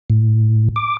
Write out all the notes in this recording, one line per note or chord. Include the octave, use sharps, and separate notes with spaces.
A2
D6